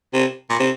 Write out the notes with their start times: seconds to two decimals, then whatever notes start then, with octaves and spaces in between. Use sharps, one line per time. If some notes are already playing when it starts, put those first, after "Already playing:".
0.13 C3
0.50 A#2
0.59 C3